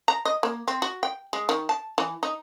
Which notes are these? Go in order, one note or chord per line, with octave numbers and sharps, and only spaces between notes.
A#5
D#5
A#3
C4
F#4
G5
G#3
D#3
A5
E3
D#4